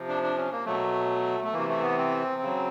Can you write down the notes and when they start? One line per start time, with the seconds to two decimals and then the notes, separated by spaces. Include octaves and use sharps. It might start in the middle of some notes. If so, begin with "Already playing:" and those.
Already playing: C3 F3
0.08 D4
0.23 D4
0.37 C#4
0.52 A#3
0.66 B2 F#3 A3
1.44 A3
1.53 C3 E3 A#3
1.69 A3
1.82 B3
1.98 C4
2.42 C#3 F#3